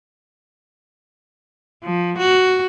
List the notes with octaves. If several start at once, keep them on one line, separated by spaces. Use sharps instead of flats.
F3
F#4